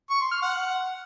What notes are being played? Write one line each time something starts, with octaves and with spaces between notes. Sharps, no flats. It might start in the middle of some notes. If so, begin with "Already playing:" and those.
C#6
C6
F6
F#5